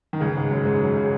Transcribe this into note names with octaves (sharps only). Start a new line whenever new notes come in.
D#3
C#2 C#3
G#2 G#3
F#2 F#3
G#2 G#3
F#2 F#3
C#3